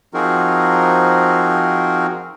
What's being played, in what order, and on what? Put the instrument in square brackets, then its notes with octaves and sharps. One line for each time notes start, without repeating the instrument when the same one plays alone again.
[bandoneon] F3 C4 D#4 F#4 G#4 A#4